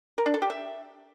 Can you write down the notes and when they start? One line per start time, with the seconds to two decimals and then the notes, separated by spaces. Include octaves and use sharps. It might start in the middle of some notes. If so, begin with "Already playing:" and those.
0.18 A#4
0.26 D4
0.34 A4
0.42 G4
0.50 E5